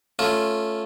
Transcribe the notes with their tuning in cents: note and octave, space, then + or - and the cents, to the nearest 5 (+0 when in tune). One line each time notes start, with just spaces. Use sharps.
A3 +0 C#4 +0 F4 +0